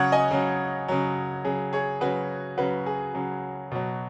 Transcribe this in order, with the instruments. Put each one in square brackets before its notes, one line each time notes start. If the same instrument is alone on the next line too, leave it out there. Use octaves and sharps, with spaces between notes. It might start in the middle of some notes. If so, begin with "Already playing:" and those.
Already playing: [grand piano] C#3 F#3 C#5 F#5
D#5 G#5
C#3 F#3
C#3 F#3
C#3 F#3 G#4
G#4 C#5
C#3 F#3 F#4 B4
C#3 F#3 F#4 B4
G#4
C#3 F#3
B2 F#3